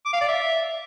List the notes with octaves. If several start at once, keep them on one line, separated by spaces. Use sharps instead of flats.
D6
F5
D5
E5